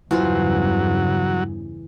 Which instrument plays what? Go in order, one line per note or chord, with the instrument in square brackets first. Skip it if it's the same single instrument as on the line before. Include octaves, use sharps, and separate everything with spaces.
[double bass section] E2 G2 C#3 [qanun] E3 F4 C5 [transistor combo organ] F#3